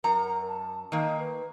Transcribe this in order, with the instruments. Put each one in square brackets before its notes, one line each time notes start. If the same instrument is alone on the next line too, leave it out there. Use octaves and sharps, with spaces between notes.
[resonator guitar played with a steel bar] F#2 A#5 [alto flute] A#4
[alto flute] A5
[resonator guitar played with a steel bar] D#3 A#3 [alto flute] D#5
[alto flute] B4